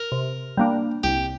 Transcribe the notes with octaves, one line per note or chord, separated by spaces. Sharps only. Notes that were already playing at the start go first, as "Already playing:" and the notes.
Already playing: A#4
C3
G3 A#3 D4
C2 G4